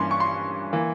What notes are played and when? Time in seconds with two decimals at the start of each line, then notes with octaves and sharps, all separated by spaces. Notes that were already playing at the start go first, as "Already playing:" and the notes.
Already playing: G2 E3 A#3 C#4 C6
0.11 C#6
0.20 C6
0.73 E3 A#3